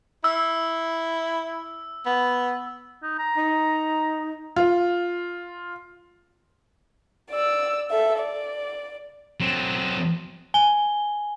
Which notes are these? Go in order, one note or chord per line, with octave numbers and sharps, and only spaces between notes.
E4 E6
B3
D#4
A#5
D#4
F4
D5 E6
A4 E5
D5
F#3 C4
G#5 G7